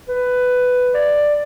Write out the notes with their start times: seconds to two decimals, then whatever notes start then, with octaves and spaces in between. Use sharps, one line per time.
0.08 B4
0.94 D5